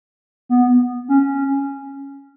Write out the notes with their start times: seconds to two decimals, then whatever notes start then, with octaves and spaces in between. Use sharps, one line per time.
0.49 B3
1.08 C#4